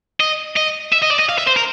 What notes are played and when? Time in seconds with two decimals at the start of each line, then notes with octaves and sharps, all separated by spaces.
0.20 D#5
0.57 D#5
0.93 E5
1.02 D#5
1.11 D5
1.19 D#5
1.29 F5
1.38 E5
1.47 C5
1.56 A#4